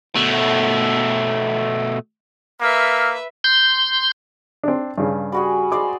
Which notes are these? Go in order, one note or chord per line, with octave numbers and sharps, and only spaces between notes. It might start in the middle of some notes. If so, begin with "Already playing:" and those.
B2 A3
A#3 B4 E5 E6 F6
C6 G6
C4 D4
G2 C#3
G3 F#4 G#4
G#3 C5 D5 D6